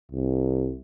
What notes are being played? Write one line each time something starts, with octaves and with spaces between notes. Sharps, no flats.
C2